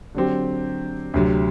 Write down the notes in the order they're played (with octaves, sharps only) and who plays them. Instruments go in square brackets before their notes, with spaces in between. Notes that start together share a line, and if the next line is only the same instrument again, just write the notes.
[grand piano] D3 F#3 C4 G4
D2 C3 F#3